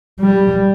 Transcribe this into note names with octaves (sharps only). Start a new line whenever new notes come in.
G3